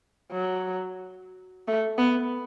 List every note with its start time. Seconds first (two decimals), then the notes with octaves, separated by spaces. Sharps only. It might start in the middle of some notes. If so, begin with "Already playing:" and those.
0.32 F#3
1.68 A3
1.98 B3